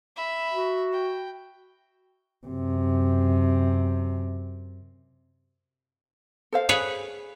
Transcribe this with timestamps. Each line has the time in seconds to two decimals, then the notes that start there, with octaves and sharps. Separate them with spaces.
0.16 E5 B5
0.53 F#4
0.92 G5
2.47 F#2 C3
6.52 A4 C5 F5
6.69 G#4 B4 C#5